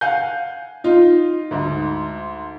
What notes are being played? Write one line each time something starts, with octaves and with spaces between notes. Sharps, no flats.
F5 F#5 G#5 G6
D#4 F4
D2 G#2